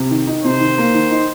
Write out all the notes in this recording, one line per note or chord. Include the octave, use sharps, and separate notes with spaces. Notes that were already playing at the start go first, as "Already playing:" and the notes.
Already playing: C3
D#3
D#4
C3 C5
D#3
A#3
D#3
D#4